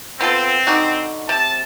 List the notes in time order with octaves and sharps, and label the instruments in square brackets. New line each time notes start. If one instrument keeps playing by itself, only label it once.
[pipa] B3 F4 A4 [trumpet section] C4
[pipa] D3 D#4 F#4
[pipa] C3 [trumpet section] A5